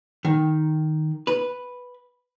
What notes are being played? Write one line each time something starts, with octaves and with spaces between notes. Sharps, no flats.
D#3
B4